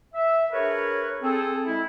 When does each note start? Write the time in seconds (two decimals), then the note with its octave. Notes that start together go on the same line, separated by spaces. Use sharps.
0.14 E5
0.52 D4 G#4 A#4 B4 C#5
1.21 C4 G#4 A4
1.65 G#3 E4